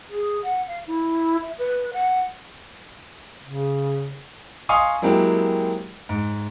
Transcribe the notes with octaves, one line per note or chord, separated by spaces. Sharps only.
G#4
F#5
F5
E4
E5
B4
F#5
C#3
D#5 F5 G#5 C6 C#6 D#6
F#3 G#3 A#3 C4 E4 G4
G#2